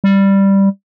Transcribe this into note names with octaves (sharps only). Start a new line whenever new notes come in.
G3